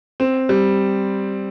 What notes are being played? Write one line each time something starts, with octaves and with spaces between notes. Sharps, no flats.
C4
G3